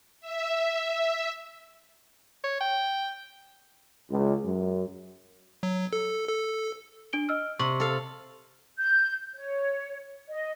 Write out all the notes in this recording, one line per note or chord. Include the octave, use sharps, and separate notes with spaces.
E5
C#5
G5
C#2
F#2
F#3
A4
A4
D4 D7 G7
D#5 E6 F6
C3 C#6 F#7
A4 F5
G6
C#5
D#5